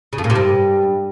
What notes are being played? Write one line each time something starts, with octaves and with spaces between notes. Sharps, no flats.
C#3
F2
A#2
C3
G2